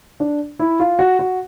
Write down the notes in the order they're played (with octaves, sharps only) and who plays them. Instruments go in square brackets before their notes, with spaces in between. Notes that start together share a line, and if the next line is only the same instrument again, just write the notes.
[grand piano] D4
E4
F4
F#4
F#4